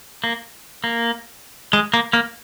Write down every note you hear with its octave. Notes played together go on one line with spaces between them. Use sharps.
A#3
A#3
G#3
A#3
A#3